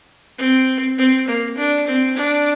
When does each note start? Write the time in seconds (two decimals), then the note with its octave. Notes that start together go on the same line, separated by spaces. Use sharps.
0.38 C4
0.98 C4
1.27 A#3
1.57 D4
1.87 C4
2.17 D4